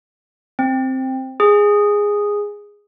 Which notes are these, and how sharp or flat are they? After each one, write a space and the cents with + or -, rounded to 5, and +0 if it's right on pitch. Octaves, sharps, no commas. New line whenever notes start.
C4 +5
G#4 -10